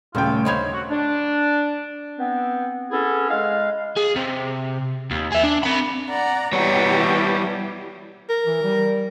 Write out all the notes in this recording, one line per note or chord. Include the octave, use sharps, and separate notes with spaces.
D#1 C#3 A3 F4 G5
D3 D#4 C5 C#5 F5 B5 G#6
F#4
D4
B3 C4
B3 C#4 E4 G#4 A4
G#3 F5
G#4
C3
D#2
G#4 E5
D4
C4 B5
D5 F#5 A#5
B2 G3 E4 G4 C#5
A#4
E3
G3